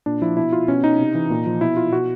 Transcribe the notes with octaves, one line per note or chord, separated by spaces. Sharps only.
A#2 D4
F3 E4
B2 E4
F4
B2 C#4
D#4
C3
E3
A#2
F3
B2 E4
F4
B2 F#4